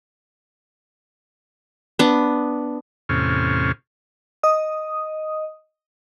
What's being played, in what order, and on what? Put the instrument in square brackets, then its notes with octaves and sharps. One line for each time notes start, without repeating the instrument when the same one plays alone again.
[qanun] B3 D4
[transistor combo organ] E2 A2 C3 C#4 F6
[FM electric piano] D#5 D#6